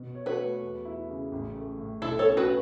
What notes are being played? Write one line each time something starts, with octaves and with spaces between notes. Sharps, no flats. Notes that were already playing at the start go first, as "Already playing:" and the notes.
Already playing: B2
C#5
F#4 B4
A3
E2
E4
C#3
A1
A3
A2
B1 E4 A4
A4 C#5
C#4
F#4 B4